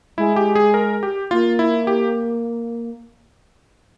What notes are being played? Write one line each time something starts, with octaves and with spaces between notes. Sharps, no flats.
G#3 E4
G4
G#4
A#4
G4
A#3 F4
E4
G4